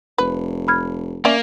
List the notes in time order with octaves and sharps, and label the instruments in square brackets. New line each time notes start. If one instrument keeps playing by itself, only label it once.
[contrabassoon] F1 [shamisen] B4
[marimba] B5 F6 G#6
[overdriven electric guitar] A#3 [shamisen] C#4 D5 E5